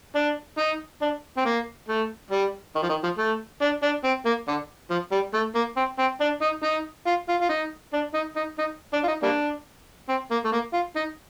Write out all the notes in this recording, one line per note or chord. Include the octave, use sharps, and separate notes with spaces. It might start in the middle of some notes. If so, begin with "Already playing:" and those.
D4
D#4
D4
C4
A#3
A3
G3
D#3
F3
D#3
F3
A3
D4
D4
C4
A#3
D3
F3
G3
A3
A#3
C4
C4
D4
D#4
D#4
F4
F4
F4
D#4
D4
D#4
D#4
D#4
D4
F4
D#4
G3 A#3 D4
C4
A#3
A3
A#3
F4
D#4